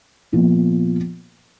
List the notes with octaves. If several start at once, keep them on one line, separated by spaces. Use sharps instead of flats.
A#2 F3 B3 F4